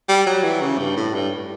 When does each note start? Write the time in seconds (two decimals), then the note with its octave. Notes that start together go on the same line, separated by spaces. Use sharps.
0.09 G3
0.27 F#3
0.44 E3
0.61 C#3
0.79 G2
0.97 A2
1.15 G2